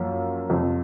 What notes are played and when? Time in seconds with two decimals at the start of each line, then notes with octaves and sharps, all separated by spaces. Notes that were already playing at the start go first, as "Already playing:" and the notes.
Already playing: F#2 F3 A#3
0.50 F2 C3 F3 C4